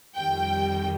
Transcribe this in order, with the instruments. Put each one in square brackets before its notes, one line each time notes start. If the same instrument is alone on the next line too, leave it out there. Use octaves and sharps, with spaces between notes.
[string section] F2 D#3 G3 G5